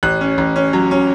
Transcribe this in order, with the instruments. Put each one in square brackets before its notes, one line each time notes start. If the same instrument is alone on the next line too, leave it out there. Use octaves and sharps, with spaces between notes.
[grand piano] A1 F#6
C#4
A1
C#4
F#3
C#4